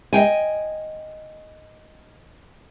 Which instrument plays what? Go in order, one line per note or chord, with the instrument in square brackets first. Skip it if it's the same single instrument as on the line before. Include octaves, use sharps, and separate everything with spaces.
[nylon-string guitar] D#5 F5 G5 G#5